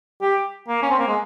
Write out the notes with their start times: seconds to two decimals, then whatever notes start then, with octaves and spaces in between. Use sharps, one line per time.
0.22 G4
0.68 A#3
0.82 C#4
0.91 C4
0.99 A#3
1.08 G#3